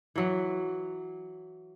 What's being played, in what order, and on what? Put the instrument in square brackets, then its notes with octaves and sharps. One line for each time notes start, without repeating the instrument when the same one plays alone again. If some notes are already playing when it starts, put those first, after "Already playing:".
[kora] E3 F#3